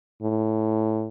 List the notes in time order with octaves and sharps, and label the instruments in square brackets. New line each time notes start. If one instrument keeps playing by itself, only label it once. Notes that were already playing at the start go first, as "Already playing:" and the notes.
[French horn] A2